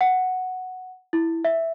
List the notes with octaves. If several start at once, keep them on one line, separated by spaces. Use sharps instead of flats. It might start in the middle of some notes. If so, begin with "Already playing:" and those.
F#5
E4
E5